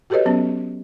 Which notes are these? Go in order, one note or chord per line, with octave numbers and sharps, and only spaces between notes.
F#4 G4 A4 B4 C#5 D#5
F#3 B3 C#4